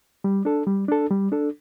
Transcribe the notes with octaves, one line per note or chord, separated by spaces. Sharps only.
G3
D4 A4
G3
D4 A4
G3
D4 A4